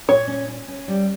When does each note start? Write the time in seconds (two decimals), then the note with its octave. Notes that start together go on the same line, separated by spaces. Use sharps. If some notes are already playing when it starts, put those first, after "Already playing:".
0.08 A#2 C#5
0.27 C#4
0.48 C#4
0.68 C#4
0.88 G3